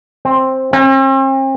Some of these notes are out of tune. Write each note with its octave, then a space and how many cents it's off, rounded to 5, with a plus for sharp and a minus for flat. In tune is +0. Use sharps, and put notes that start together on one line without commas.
C4 +10
C4 +45